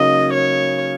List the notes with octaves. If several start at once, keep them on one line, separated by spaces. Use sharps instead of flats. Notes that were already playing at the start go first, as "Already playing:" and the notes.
Already playing: C#3 F#3 A#3 D#4 D#5
C#5